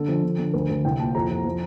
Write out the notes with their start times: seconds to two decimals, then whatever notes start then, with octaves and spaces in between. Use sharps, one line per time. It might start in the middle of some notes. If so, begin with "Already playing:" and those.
Already playing: D3 A4
0.08 F3
0.23 D3
0.39 D3
0.54 D2 A#4
0.69 D2
0.85 C2 G5
1.00 A#2 A5
1.15 F2 A#5
1.30 F2
1.45 F3